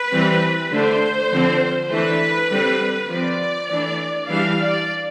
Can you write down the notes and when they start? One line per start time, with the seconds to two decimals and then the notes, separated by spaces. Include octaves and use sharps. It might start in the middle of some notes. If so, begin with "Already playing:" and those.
Already playing: B4
0.12 E3 G3 C4
0.71 D3 A3 D4 C5
1.31 D3 F3 C4
1.90 E3 A3 D4 B4
2.50 D3 G3 C4
3.10 F3 C4 D5
3.69 E3 A3 D4
4.29 E3 G3 D4 F5
4.59 D5